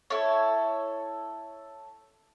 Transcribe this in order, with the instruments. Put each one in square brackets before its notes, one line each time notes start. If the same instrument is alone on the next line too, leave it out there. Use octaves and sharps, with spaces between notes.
[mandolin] E4 A4 C#5